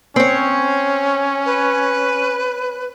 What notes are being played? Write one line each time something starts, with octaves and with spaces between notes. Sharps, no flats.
C4 C#4 C#5
B4